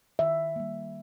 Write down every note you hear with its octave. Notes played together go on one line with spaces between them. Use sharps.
D#3 E5
G3 A#3